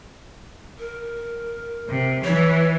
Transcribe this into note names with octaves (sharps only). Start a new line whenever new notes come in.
A#4
C3
E3 C#5